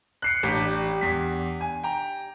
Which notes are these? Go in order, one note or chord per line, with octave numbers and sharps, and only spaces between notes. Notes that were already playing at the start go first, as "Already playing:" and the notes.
F#6 C7 C#7
A1 D4 G4
E2 B6
G#5
G5 A#5